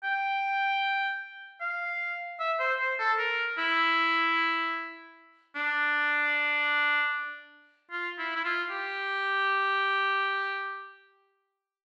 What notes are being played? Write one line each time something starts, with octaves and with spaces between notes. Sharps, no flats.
G5
F5
E5
C5
C5
A4
A#4
E4
D4
F4
E4
E4
F4
G4